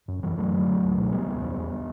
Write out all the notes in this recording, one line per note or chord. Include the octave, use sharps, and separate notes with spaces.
F#2
F#2 E3 G3
F#2 F#3 A3
D3
D3
C#2
B2
C#2 G3 B3
C#2
E2
E2